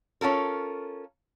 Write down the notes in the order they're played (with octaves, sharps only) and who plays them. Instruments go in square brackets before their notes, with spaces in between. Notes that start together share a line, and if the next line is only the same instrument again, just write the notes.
[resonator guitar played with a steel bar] C#4 F4 A4 A#4